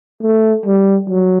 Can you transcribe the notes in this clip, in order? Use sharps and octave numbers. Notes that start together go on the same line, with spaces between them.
A3
G3
F#3